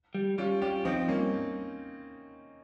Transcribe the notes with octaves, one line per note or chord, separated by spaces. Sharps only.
G3
G3 C#4 F4
C#4 F4 G4
F3 C4 D#4
G2 A#3 C#4